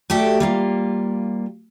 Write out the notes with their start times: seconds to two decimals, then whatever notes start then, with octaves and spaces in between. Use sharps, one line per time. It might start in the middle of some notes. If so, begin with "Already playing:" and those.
0.10 A3 F#4 G4 A4 D5
0.40 G3 A#3 F4